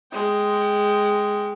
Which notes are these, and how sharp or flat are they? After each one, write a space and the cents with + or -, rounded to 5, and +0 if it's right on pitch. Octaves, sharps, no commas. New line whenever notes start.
G#3 +0 G5 +0